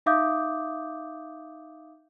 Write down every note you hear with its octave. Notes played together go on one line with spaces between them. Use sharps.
D#4 E5 F5 D6 D#6 G6